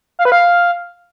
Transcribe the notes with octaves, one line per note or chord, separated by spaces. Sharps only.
F5
B4
F5